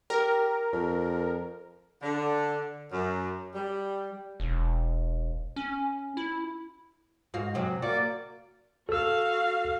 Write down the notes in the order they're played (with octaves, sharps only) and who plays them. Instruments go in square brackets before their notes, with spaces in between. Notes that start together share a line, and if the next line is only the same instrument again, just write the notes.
[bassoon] G4 [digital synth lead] A#4
[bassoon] F2
[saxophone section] D3
F#2
G3
[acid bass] E1
C#4
E4
[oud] G#2 F#4 F5
F#2 C3 F#3
[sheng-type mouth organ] A#3 D5 D6 [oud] F#4
[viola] F#4 F5 [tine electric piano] A4 E6